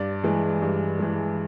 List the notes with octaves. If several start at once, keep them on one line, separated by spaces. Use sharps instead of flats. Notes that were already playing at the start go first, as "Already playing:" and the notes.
Already playing: G2 D5
E3 G#3
G2
E3 G#3